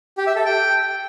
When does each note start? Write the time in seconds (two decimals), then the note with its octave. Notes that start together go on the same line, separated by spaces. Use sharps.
0.18 G4
0.27 E5
0.36 A4
0.45 G5